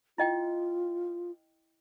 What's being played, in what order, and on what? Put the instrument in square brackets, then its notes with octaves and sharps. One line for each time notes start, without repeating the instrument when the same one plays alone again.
[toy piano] E4 D#5 G5 [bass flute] F4